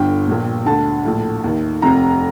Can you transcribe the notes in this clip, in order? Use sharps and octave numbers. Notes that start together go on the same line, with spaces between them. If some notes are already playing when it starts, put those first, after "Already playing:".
Already playing: G1 G2 D3 G5
A#1 A#2
D2 D3 A5
A#1 A2
D#2 D#3
F1 F2 C3 A#5